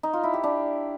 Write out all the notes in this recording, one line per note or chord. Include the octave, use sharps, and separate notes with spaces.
D#4
F4
E4
G4
D4